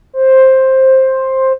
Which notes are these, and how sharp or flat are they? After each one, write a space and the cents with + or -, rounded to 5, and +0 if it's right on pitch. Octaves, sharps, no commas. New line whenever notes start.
C5 +10